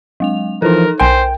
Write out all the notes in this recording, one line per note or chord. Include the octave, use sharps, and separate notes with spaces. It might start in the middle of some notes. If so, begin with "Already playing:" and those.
F#3 G#3 F7
E3 F3 D#4 A4 A#4
B1 A#4 C5 G5 G#5 C6